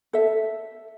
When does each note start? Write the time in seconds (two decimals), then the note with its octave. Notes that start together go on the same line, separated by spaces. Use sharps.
0.13 A4 E5